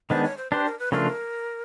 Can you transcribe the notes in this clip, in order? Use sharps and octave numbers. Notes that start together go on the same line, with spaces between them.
D#3 G#3 B3 D4 C5
C#5
C5
D4 G4 B4 C5
A#4
B4
C#3 F3 A3 D4 F4 A#4